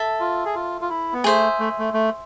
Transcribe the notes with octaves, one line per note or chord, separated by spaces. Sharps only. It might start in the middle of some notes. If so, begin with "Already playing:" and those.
Already playing: A4 E5 A5
F4
G#4
F4
F4
E4
B3
A3 G#4 C5 E5
A3
A3
A3